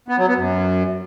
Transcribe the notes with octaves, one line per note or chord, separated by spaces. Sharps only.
B3
F#3
B3
F#2